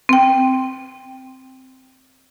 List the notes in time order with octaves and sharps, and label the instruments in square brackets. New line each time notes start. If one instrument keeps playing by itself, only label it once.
[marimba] C4 G5